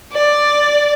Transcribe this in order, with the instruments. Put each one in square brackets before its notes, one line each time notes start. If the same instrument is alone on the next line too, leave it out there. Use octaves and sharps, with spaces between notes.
[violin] D5